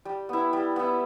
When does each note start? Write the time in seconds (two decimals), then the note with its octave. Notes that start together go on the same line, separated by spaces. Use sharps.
0.05 G3
0.29 B3 E4
0.53 G3
0.76 B3 E4